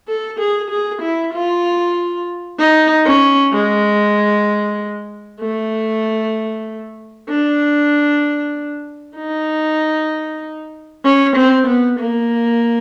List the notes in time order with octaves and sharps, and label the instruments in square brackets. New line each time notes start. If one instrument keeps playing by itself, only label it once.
[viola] A4
G#4
G#4
E4
F4
D#4
C#4
G#3
A3
D4
D#4
C#4
C4
B3
A#3